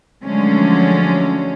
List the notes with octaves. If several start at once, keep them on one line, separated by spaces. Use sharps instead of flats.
D3 F3 F#3 G#3 A3 C#4